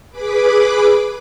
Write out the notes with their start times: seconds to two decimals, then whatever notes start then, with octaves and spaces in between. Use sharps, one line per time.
0.11 G#4 B4 B5 D6